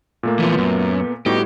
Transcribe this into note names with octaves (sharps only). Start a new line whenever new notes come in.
A#2 A3 A#3
E3 F3 B3
F#2
A2 G3 B3 D#4 F#4 G4